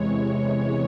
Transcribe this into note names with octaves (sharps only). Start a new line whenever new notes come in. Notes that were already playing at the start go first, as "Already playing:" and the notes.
Already playing: E2 C3 E3 G#3 C#5
C#5